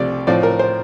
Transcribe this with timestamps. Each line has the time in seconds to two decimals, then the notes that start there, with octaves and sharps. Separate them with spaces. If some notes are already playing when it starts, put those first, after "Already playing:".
Already playing: C2 C3 F3 A3 D5
0.27 A2 F3 C4 D5
0.43 A#4
0.59 C5